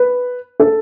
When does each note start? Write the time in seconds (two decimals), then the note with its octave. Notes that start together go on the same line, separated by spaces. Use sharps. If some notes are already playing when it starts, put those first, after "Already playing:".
Already playing: B4
0.60 A4